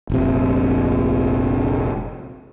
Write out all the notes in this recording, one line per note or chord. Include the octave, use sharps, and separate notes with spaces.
F1 A#1 C3